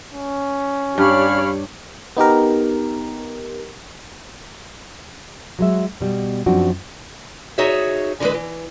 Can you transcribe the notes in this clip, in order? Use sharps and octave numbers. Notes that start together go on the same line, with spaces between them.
C#4
G2 G4 C#5 D5 F5 B5 F6
B3 D#4 G4 A#4
F#3 G#3 E5
B2 G3
F#2 F3 C4 D4 F#4
D#4 F#4 G#4 C#5 E5
D3 E3 F#3 G#3 B4
E3